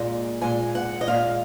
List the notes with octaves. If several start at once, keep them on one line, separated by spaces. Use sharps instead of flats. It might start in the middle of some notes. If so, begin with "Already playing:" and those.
Already playing: A#2 G#3
A#2 G#3 G#5
F#5
D#5
A#2 G#3 F5